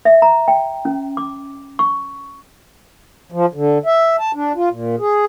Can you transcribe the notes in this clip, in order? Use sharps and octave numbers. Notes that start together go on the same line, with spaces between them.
E5
A#5
G5
C#4
D6
C#6
F3
D3
E5
A5
D4
F4
A#2
G#4